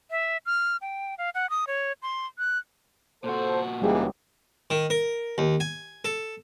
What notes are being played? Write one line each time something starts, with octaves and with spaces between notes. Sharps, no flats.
E5
F6
G5
F5
F#5
D#6
C#5
C6
F#6
A#2 F#4 A4 C5
C#2 G#2 E3 G3 G#3 A#3 G4 G#4
D#3
A#4
D#2
G#5
A4